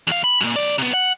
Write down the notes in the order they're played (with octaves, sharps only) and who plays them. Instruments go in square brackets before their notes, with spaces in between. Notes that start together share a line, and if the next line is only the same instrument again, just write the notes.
[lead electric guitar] E2 F5
B5
F#2 A#2
B1 D5
C3 B3
F#5